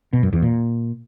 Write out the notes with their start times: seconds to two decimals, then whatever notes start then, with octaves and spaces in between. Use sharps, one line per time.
0.13 B2
0.23 F#2
0.33 E2
0.43 A#2